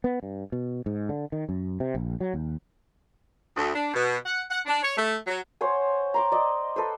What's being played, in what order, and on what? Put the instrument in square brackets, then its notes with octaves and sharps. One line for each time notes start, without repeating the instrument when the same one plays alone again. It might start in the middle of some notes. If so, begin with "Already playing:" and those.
[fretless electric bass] B3
G2
B2
G#2
D3
D#3
F#2
C3
A#1
F#3
D#2
[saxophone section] D2
D4
B2
F#5
F#5
D4
C#5
A3
F#3
[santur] C5 C#5 F#5 G#5
A#5 C6 D6
D5 D#5
A4 B4 C5